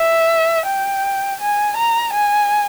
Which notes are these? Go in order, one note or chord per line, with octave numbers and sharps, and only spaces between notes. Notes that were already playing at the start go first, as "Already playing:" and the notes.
Already playing: E5
G5
G#5
A#5
G#5